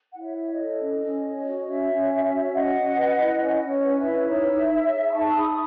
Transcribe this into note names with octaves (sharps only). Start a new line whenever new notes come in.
E4 F#5
C#5 E5
C#5
D#5
A4
C#4
C#4
C#5
F#4
C#4 C#5 E5
C#4
C#5
F#4
C#4 D#5 F#5
C#4
B4
E4
C#4 D#5
C#4
C#5
B4
C#5 E5
E4
D#4 C#5 E5
D#4
C#5
G#4
B5
D#4 A5 C#6
E6
D#4 B5 D#6
D#6